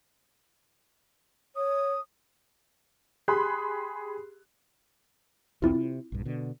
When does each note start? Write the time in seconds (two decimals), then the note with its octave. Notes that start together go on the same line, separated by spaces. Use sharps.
1.56 C#5 D#6
3.28 G4 G#4 B5 C6 F#6
5.62 B1 E2 E3 C4 E4 F4
5.75 C3
6.12 A#1 G2
6.25 B2 D3